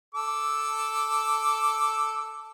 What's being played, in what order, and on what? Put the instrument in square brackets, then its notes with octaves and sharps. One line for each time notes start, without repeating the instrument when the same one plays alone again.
[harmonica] A4 D6 E6